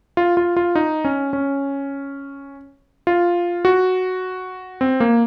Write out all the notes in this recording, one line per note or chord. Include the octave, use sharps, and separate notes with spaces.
F4
F4
F4
D#4
C#4
C#4
F4
F#4
C4
A#3